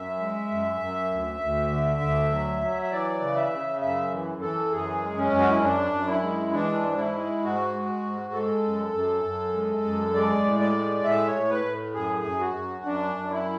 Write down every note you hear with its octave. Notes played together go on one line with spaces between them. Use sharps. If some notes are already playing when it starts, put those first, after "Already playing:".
Already playing: F#2 E5
G#3
F#2
F#2
D2
D2
D3
D2
F#3
F#3
E5
E3 D5
C#3
E5
C#3
F#2 E5
E3
E3 A4
F#2 G#4
G#3
C#4
F#2
F#4
E4
F#2 D4
F#2
E4
G#3
E3 D4
G#2
E4
G#3
G#2 F#4
G#3
G#2
G#3 A4
F#2
F#2
F#2
G#3
F#2
G#3 D5
A2
D5
G#3
A2 E5
C#5
A2
B4
A2
F#2 G#4
F#2
F#4
F#2
F#2 D4
F#2
E4